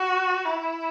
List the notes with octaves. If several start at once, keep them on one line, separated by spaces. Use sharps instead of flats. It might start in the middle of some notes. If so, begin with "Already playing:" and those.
Already playing: F#4
E4